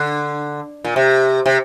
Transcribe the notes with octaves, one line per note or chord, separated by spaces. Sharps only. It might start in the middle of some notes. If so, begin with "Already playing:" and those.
Already playing: D3
A#2
C3
C3